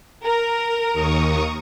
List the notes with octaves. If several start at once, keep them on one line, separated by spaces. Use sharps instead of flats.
A#4
D#2 C#6 D#6